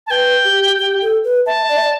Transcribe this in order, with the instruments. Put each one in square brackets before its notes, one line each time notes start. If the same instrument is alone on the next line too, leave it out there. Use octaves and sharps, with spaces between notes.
[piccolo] A5
[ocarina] B4 [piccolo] G5
[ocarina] G4
G4
A4
B4
[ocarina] E5 [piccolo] A5
[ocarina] D5
E5
D5